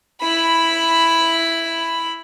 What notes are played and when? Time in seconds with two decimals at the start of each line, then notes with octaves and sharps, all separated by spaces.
0.22 E4 B5